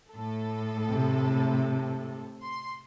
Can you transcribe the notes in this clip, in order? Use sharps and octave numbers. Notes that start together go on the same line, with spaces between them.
A2 A4
C3
C6